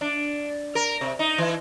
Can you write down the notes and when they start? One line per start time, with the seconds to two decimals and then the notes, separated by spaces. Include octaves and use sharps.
0.01 D4
0.75 A#4
1.01 C3
1.19 D#4
1.38 E3